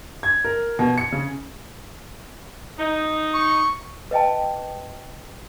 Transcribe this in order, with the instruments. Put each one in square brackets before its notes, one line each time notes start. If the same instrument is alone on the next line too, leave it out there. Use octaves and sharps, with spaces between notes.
[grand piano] G#6
A#4
B2
C#7
C#3
[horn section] D#4
[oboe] C#6
[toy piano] B4 D#5 G5 A5